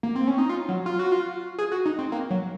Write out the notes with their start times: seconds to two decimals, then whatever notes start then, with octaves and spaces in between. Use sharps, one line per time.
0.03 A#3
0.16 C4
0.27 C#4
0.38 D#4
0.49 F4
0.69 F#3
0.86 F4
0.99 F#4
1.12 F4
1.58 G#4
1.72 F#4
1.85 D#4
1.99 C4
2.12 A#3
2.30 F#3